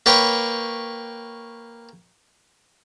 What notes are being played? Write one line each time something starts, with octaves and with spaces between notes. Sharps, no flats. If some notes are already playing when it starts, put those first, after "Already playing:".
A#3 B4 C#5 G5